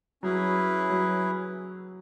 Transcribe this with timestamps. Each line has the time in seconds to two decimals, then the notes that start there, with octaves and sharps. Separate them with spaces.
0.22 F#3 C#4 E4 G#4 B4
0.90 F#3